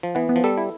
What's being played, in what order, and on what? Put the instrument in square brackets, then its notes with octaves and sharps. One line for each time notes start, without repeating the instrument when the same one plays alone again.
[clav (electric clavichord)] F3
[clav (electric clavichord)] E3 [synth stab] B3
[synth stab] B3
[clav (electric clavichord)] F3
[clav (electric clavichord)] G3 [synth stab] A4
[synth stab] E4